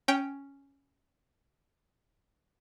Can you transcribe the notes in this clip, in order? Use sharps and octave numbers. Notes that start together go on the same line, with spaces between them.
C#4 G5